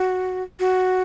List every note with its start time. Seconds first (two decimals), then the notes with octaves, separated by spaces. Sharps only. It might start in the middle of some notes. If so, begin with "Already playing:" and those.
Already playing: F#4
0.60 F#4